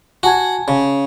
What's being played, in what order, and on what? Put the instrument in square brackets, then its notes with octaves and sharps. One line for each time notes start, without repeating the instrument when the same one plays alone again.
[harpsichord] F#4 [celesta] G#5 A5 G#6
[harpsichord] C#3